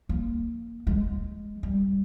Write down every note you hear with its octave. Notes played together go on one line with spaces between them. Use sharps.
A#3
G#3
G3